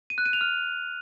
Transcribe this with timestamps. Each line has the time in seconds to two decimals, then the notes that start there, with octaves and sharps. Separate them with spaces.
0.10 D#7
0.18 F#6
0.26 D#7
0.33 F7
0.41 F6